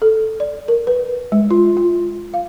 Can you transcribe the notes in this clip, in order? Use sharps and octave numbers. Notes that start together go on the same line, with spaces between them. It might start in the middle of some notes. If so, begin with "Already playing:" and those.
A4
D5
A#4
B4
G#3
F4
F4
F5